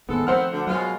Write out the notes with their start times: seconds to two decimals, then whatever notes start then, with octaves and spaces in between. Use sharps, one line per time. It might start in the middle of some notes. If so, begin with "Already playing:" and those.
0.09 A1 D#2 G#2 G#3 B3 A4
0.27 D#3 F3 A3 B3 C4 C5 F#5 F6
0.52 D2 D3
0.67 B2 F#3 G#3 A#3 F4